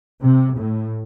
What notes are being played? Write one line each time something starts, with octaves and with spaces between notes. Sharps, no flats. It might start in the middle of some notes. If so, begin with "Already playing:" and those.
C3
A2